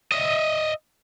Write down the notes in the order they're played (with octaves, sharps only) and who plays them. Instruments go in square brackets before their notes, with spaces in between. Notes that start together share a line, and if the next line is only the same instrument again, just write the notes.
[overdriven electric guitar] D#5 E5